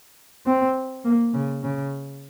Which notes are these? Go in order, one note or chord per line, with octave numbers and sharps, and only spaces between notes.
C4
A#3
C#3
C#3